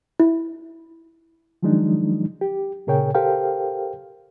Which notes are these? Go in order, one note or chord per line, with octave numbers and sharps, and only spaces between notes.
E4
D#3 F3 F#3 G#3 D4 D#4
G4
A#2 C#3 G#4 A#4 C#5 G5
G4 A4 A#4 C5 F5 G5